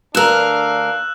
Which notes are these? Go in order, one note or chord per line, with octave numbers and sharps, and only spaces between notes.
D2 D4 A#4 F5 E6 F#6 E7